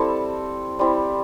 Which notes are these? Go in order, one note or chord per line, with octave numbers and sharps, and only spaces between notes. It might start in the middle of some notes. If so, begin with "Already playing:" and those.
Already playing: G3 C4 E4 A4 A5
G3 C4 E4